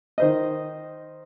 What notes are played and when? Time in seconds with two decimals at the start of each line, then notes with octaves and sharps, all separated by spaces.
0.18 D#3 C5 D#5